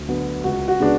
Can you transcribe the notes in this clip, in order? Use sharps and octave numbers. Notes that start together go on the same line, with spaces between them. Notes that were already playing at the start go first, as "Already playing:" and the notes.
Already playing: D2
D3 F#3 B3
C#2 F#4
F#4
C#3 G#3 B3 D4